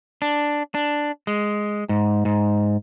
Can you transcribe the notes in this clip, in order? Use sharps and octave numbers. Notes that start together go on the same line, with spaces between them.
D4
D4
G#3
G#2
G#2